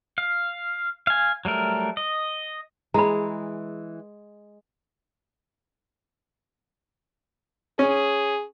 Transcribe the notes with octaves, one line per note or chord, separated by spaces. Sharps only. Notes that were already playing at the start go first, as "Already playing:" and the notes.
F5
F5 G#5
F#3 G3 A3 A#4
D#5
E3 G#3 G#4 A#5 B5
C#4 G#4